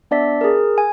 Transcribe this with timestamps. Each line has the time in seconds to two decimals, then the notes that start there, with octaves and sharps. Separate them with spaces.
0.11 B3 D4 D5 E5 B6
0.41 G#4 A#4
0.78 G#5